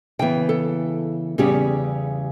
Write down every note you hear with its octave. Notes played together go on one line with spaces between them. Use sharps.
C#3 E3 B3 G5
A4
E2 C#3 G3 C#4 G4